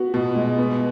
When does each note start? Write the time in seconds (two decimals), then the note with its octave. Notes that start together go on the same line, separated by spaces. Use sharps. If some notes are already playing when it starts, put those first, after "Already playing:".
Already playing: B3 F#4
0.14 B2
0.35 G#3
0.58 B3